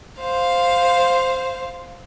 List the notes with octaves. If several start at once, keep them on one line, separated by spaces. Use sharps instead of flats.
C5 F5